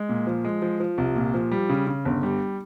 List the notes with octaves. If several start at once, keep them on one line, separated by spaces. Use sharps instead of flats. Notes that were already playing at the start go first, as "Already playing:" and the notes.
Already playing: G#3
A#2
F3
G#3
F3
F3
C2
A#2
F3
G3
C#3
C#3
G1
G3